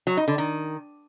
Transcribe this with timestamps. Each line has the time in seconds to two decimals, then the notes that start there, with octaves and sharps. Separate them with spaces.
0.07 F#3
0.17 D#4
0.28 D3
0.38 D#3